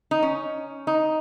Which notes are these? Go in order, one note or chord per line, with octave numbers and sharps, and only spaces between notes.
D#4
C#4
D#4